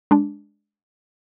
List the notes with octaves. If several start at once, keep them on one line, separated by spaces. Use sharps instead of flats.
G#3 D4